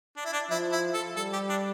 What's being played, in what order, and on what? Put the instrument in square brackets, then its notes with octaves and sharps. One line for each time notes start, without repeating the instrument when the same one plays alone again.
[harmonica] D4
E4
D4
[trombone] F3 [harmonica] E4
[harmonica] E4
A4
[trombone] G3 [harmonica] A4
[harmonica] G4
D4